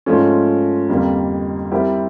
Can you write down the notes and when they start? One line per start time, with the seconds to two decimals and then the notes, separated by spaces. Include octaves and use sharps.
0.06 G#2 F3 A3 C#4
0.88 F2 D3 G3 A#3
1.71 G3 C4 E4 G4 A#4